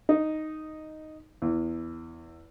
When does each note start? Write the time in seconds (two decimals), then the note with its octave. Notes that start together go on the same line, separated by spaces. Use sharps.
0.09 D#4
1.42 E2